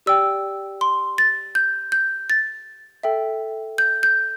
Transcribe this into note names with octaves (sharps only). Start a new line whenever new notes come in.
G4 D5 G5 E6
C6
A6
G6
G6
A6
A4 E5 G5
G6
G6